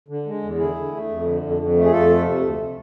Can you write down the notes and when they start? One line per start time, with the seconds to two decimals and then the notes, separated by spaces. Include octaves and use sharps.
0.08 D3
0.26 G#3
0.42 E2
0.58 D3 E4 G#4
0.75 D3
0.92 A3
1.09 F2
1.25 D3
1.42 F2
1.58 F2
1.76 A3
1.84 G#4
1.92 F2 F4 A4
2.09 A3
2.25 C3
2.42 D2